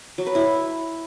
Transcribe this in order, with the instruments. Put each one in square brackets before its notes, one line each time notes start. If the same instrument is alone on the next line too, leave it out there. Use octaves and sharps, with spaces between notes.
[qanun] F#3
B4
E4